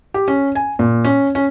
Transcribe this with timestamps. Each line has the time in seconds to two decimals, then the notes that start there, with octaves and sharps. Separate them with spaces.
0.14 G4
0.28 C#4
0.55 G#5
0.79 A#2
1.05 C#4
1.35 C#4